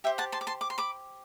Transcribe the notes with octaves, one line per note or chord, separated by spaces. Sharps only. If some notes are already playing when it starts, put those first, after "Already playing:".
G4 C5 E5 G5
F#5 A5
A5 C6
D6
A5 C6
D6
C6
B5 D6